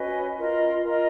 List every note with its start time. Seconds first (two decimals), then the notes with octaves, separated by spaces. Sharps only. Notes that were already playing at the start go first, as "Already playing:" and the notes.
Already playing: C#4 F#4 B4 D#5
0.37 F4 A#4 D#5
0.84 F4 A#4 D#5